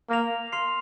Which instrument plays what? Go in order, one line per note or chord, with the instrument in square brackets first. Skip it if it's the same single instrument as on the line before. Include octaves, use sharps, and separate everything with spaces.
[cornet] A#3 [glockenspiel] F6 A#6 F7
[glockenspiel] C6 F6 C7 F7